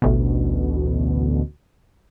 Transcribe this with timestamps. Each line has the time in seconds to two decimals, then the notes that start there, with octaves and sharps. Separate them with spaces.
0.02 A1 D2 B2